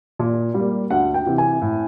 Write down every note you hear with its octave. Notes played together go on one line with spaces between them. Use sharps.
A#2
G3
A#3
D2 F#5
G5
C3 E3
G#5
A2